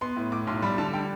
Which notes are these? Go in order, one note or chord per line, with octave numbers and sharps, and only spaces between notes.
B3 C6
A2
A2 D6
B1 C6
G3 B5
D3 A5
G3 G5